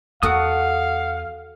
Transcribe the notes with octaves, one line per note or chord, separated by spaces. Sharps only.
E2 F#4 A4 A#4 F5 F#5 D#6